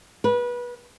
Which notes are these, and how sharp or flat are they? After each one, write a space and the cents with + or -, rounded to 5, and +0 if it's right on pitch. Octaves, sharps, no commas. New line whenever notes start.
B4 -25